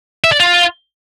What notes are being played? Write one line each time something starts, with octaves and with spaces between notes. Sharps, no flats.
E5
D5
F4